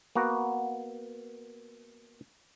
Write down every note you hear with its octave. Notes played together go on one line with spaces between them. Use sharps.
A#3 B3 F#4